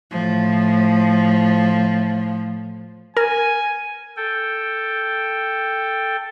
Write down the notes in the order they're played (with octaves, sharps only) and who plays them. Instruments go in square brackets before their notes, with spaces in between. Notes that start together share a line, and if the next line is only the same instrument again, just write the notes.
[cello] A2 F3
[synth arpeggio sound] A#4 [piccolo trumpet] G#5
[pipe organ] A4 G5